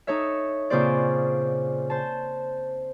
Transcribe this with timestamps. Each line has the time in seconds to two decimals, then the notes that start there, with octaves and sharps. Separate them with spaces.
0.07 D#4 A4 C#5 E5
0.70 A#2 C#3 C4 G#4 C5 D5
1.90 C5 A5